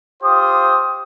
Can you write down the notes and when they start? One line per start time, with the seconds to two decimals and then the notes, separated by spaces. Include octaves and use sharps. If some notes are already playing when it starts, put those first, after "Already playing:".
0.23 F4 G4 C5 D#6